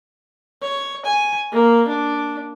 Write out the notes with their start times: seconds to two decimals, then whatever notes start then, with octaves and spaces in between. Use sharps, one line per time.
0.62 C#5
1.05 G#5
1.52 A#3
1.88 D4